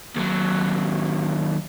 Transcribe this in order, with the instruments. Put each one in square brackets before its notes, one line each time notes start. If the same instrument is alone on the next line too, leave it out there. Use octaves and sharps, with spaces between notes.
[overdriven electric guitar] D#2 F#3